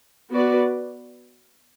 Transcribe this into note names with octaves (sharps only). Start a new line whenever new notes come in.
B3 F#4 B4 D5